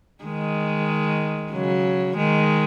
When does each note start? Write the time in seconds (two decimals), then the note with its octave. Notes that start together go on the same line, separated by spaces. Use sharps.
0.24 D#3 G#3
1.52 C#3 F#3
2.17 D#3 G#3